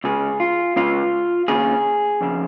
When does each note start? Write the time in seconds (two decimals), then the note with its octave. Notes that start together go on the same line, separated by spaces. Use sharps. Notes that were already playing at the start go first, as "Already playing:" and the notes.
0.04 C#2 C#3 G#4
0.40 F4
0.76 C#2 C#3 F4
1.48 D#2 C#3 G#4
2.21 F2 C#3